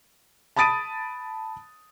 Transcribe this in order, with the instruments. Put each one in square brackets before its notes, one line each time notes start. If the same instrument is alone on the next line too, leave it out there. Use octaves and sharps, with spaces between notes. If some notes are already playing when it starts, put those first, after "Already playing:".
[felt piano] A5 B5 D#6 A6 D7 D#7